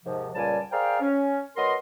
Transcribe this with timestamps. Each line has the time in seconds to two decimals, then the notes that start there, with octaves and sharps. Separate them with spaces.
0.04 D#2 G#2 C3 F3
0.35 C#2 A#2 G3 D5 G#5 A5
0.71 G#4 A#4 C5 D5 F5 G5
1.01 C#4
1.57 F#3 B3 A#4 D#5 C6